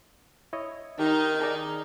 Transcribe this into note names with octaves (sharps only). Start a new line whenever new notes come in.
E4 C#5 D#5
D#3 D#4 G4
D#4 G#4 D5